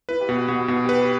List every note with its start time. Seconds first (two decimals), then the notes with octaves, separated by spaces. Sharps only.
0.09 E4 B4
0.20 G4
0.28 B2 F#4
0.48 B2 F#4
0.68 B2 F#4
0.84 G4 B4
0.99 G4